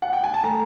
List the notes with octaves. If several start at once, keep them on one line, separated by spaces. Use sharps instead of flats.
F#5
G5
G#5
A5
A3 A#5